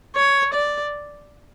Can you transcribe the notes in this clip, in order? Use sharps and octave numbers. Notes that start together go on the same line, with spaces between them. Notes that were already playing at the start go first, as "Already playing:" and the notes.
C#5
D5